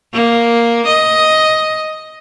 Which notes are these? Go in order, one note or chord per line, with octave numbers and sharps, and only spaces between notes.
A#3
D#5